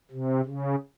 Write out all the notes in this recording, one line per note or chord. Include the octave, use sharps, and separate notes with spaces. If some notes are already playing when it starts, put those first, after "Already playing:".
C3
C#3